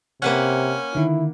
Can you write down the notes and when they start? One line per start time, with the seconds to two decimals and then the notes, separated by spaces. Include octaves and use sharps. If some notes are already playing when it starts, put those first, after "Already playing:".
0.22 C3 A#3 C#4 B4 F#5
0.95 D3 D#3 E4